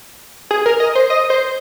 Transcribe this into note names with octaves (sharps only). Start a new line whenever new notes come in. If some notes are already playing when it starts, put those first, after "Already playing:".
G#4
A#4
D#5
C5
D#5
C5